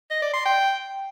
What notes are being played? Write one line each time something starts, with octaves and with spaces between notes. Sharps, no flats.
D#5
D5
C6
G5